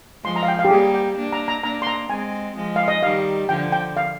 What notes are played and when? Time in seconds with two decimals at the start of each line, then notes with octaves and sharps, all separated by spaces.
0.24 F3 G#3 C6
0.36 A#5
0.43 F5
0.48 G5
0.59 F5
0.65 G4
0.70 G3 A#3 G#4
0.95 G5
1.18 A#3 D4
1.33 A#5
1.48 A#5
1.63 A#3 D4 A#5
1.82 C6
1.87 A#5
2.10 G#3 C4 G#5
2.56 F3 G#3
2.76 F5
2.88 D#5
3.03 D#3 G3 F5
3.49 D3 F3 G5
3.72 G5
3.97 F5